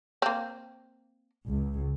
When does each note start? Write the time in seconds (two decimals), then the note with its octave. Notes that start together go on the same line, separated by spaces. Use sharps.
0.22 A#3 C4
1.49 C#2